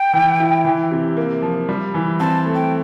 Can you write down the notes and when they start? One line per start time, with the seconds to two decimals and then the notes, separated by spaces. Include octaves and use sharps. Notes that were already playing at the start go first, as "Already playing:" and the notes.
Already playing: G5
0.13 E3
0.40 E4
0.65 E3
0.91 C3
1.17 A#3
1.42 F3
1.69 G3
1.94 E3
2.20 C4 A5
2.46 A3
2.55 G5